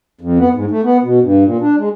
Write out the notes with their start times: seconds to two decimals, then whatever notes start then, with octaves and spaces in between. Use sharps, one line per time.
0.21 F2
0.39 B3
0.53 G#2
0.71 A3
0.84 B3
1.03 B2
1.23 G2
1.45 A#2
1.61 D4
1.78 G#3